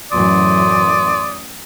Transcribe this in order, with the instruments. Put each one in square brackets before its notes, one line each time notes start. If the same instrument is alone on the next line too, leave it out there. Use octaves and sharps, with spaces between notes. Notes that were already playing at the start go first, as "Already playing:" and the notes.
[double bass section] F#2 A2 E3 [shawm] D5 [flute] C6 [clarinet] D#6